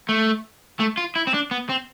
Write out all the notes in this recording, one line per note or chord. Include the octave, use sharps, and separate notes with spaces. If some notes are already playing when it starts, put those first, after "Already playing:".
A3
A3
F4
E4
C4
D4
B3
C4